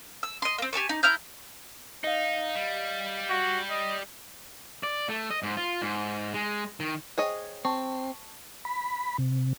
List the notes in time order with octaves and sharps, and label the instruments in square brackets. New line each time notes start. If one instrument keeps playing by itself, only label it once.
[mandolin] E6
D#5 C6
A#3 C4
G4 G#5 A5 C#6
D#4
E4 A#5 F6 G6
[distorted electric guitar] D#4 [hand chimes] D#5 F5
[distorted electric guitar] G3
[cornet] F#4
D#5
[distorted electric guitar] D5
A3
D#5
G#2
F4
G#2
G#3
D#3
[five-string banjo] G#4 C#5 D#5 [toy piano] C5 G5
[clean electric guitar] C4 [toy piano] A5 C#6
[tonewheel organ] B5
C3